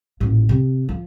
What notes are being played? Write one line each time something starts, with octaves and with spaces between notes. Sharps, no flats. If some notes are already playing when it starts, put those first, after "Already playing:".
A1 A#2
C3
F3